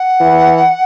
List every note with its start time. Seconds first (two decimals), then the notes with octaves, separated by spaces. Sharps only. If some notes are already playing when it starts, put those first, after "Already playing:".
Already playing: F#5
0.21 E3